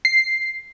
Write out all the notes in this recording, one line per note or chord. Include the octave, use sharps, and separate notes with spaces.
C7